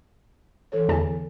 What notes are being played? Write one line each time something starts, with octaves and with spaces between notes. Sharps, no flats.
E3 A4 C#5
E2 D3 G#5 A5